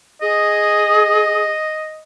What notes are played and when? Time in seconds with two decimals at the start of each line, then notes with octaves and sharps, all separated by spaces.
0.22 G#4 D#5